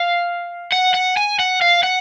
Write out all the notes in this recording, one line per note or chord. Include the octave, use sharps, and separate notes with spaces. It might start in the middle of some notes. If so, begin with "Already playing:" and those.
Already playing: F5
F#5
F#5
G#5
F#5
F5
F#5